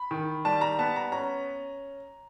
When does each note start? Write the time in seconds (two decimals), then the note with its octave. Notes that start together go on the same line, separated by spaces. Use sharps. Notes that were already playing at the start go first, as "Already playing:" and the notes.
Already playing: B5
0.11 D#3
0.45 G3 A5
0.61 A#5
0.79 B3 A5
0.96 A#5
1.12 C#4 A#5